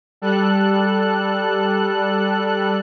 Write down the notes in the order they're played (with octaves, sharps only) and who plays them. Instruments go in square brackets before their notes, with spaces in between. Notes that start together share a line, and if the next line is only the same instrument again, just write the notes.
[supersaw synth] G3 A4 F#6